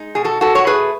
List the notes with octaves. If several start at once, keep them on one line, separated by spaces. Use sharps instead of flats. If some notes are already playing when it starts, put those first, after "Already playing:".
Already playing: G#3 D#4
B2 G#4
F#4 A4
B2 F#4 A4
C#5
A3 G#4 B4